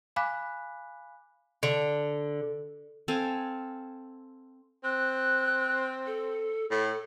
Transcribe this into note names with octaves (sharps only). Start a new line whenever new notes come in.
F5 G#5 B5 D6 F#6 B6
D3
C4 A4 F5 G#5
C4 F#6
A4
A2 A4